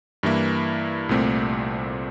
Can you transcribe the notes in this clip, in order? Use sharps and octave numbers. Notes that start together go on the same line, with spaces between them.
G2 E3 A#3 E4
C2 A#2 A3 C4